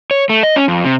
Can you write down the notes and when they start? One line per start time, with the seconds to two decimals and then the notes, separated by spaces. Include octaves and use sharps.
0.11 C#5
0.29 A3
0.43 D#5
0.56 C#4
0.68 F2
0.85 C3